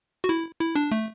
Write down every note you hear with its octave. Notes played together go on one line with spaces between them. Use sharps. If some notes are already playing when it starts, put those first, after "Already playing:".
F#4
E4
E4
D4
A3